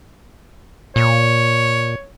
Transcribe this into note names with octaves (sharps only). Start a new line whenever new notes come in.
A#2 C#5